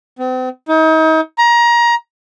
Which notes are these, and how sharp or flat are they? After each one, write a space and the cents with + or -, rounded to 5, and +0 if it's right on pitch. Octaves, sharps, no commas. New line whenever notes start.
C4 -40
D#4 +35
A#5 +25